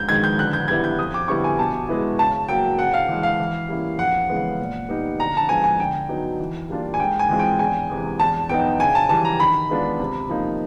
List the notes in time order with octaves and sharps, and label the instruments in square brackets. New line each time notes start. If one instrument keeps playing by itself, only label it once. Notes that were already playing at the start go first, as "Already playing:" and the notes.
Already playing: [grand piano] G#2 [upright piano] G6
[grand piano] D#3 G#3 [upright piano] G#6
[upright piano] G6
[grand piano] D3 [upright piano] F#6
[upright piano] G6
[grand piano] G3 B3 E4 [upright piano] G#6
[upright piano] G6
[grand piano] F2 [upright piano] D#6
[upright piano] D6
[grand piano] D3 G3 B3 E4 [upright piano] C#6
[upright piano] G#5
[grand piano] B2 [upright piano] A5
[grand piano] G#3 B3 E4
[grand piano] C#3 [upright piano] A5
[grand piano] F#3 A#3 [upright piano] G5
[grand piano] C#3 [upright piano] F#5
[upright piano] F5
[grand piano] E3 G#3
[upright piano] F5
[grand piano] E3
G3 A#3 C#4 E4
[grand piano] F2 [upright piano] F#5
[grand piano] C#3 E3 G#3 B3
A#2
G3 B3 D#4
[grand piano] D3 [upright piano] A#5
[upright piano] A5
[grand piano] F3 G#3 B3 [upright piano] G#5
[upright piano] G#5
[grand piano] D3 [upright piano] G5
[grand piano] F#3 B3 D#4
E3
G3 A#3 D4 F4
[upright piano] G#5
[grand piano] G#2 [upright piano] G5
[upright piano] G#5
[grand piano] E3 G#3 C4 F4
[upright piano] G5
[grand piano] E2 [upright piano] G#5
[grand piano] C3 E3 G#3
[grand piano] E2 [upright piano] A5
[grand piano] B2 F#3 B3 D#4 [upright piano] G5
[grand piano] C#3 [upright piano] G#5
[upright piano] A5
[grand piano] E3 G3 [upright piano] A5
[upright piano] A#5
[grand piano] D#3 [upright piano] B5
[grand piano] G#3 B3 D4 F4
C3
F3 A#3 D#4